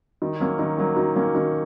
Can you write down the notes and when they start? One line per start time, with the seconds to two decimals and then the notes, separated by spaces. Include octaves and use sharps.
0.22 D#3
0.40 F#3 A#3 C#4
0.59 D#3
0.78 F#3 A#3 C#4
0.97 D#3
1.16 F#3 A#3 C#4
1.35 D#3